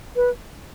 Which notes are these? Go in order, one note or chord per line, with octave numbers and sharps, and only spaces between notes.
B4